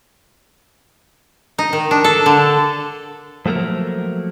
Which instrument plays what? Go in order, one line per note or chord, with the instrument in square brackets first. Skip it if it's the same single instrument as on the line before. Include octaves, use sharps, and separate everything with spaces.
[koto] D#4
D#3
D4
A4
D3
[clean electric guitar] F3 F#3 A3 A#3 A#4